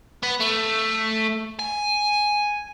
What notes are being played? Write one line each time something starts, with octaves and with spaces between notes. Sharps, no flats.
B3
A3
G#5